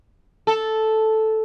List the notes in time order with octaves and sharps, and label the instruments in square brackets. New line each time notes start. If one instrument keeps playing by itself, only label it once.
[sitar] A4